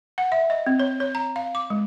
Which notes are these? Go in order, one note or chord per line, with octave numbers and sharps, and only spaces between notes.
F#5
E5
D#5
C4
C#5
C#5
A#5
F5
D6
G#3